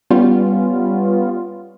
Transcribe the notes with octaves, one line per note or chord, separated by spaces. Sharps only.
G3 B3 C#4 F4